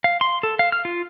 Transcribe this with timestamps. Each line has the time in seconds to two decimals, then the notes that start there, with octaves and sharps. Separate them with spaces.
0.04 F5
0.21 C6
0.43 A4
0.59 F5
0.72 F6
0.85 F4